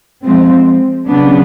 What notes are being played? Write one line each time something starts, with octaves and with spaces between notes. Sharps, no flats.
F3 G#3 C4
C#3 F#3 B3 D4